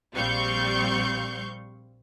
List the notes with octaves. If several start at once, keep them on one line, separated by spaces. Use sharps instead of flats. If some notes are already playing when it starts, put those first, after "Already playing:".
A#1 G3 C4 F5 C#6 G6